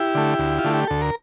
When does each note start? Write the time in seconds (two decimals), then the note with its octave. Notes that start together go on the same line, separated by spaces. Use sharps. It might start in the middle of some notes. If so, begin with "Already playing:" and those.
Already playing: E4 G4
0.15 D3 A3
0.39 D2
0.59 F4
0.64 D3 A3
0.73 G4
0.87 D2 A4
1.01 A#4